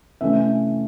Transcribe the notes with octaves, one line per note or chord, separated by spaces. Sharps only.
C3 E3 A3 C#4 E5